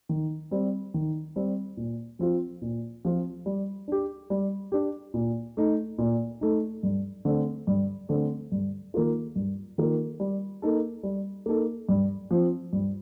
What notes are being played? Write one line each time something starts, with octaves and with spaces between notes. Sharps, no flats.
D#3
G3 C4
D#3
G3 C4
A#2
F3 C4 F4
A#2
F3 C4 F4
G3
D4 G4
G3
D4 G4
A#2
A3 D#4
A#2
A3 D#4
G2
D3 A3 C4
G2
D3 A3 C4
G2
D#3 A#3 F4 A#4
G2
D#3 A#3 F4 A#4
G3
A#3 D#4 A4
G3
A#3 D#4 A4
G2
F3 C4
G2